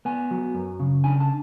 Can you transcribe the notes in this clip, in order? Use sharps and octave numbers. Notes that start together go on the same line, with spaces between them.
B3 G#5
F#3
F#2
C#3
D4 G#5
A5